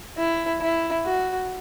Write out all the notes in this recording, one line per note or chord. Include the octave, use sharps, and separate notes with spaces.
E4
E4
F#4